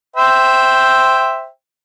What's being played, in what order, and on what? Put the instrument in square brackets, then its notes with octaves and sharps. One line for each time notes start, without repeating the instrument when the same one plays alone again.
[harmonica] C5 E5 G5